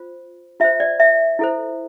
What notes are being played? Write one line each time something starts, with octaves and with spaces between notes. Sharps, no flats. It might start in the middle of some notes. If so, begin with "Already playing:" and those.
Already playing: F4 C5
F4 C5 E5
D5
E5
E4 A4 C5